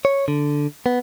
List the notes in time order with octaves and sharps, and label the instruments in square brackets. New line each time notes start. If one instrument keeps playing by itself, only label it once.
[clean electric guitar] C#5
D3
B3